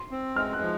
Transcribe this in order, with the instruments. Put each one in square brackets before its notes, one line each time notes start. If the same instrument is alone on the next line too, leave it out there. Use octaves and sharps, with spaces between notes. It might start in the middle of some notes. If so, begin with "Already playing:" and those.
Already playing: [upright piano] C6
[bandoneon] C4
[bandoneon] G#3 [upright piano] F6
[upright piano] F#6
[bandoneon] F3